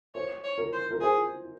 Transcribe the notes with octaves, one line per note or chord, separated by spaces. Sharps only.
C5 C#5
C#5
A#4
C5
A#4
G#4 C5